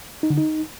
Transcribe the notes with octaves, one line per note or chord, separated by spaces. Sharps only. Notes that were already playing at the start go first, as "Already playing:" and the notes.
D#4
D3
D#4